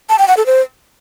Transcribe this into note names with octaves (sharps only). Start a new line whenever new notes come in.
A5
G5
F#5
A4
C5